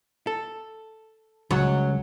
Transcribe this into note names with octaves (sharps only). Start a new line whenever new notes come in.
A4
C#2 F#3